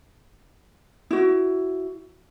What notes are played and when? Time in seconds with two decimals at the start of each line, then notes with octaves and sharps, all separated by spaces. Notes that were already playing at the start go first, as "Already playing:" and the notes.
1.11 E4 F#4